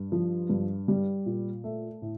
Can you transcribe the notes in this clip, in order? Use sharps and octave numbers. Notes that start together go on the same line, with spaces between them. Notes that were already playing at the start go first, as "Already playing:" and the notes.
Already playing: G2
F3
G2
G3
A#2
A3
A2